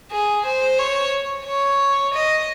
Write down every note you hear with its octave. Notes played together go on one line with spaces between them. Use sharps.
G#4
C5
C#5
C#5
D#5